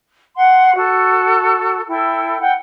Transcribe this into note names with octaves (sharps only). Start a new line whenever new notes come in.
F#5 C6
F#4 A4
E4 A4 G5
F#5 G5